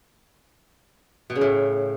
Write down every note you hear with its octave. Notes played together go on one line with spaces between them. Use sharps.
B2
C#3
A2